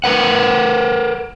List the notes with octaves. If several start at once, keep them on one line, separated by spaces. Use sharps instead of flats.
A#4 B4 F#5